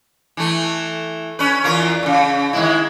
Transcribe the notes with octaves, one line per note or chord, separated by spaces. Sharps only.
E3 A3
C#4 B4
E2 F4 A#4
E2 C#3
D#3 G#3 E4